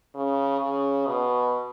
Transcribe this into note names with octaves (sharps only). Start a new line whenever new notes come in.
C#3
C#3
B2